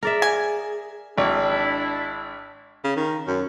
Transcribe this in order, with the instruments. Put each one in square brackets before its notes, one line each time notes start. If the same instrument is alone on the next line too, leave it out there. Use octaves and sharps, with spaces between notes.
[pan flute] G#4 [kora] A#4 D5 E5
[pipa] G#5
[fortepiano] G#1 [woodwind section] D4 E4
[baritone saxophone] C#3
D#3
F#2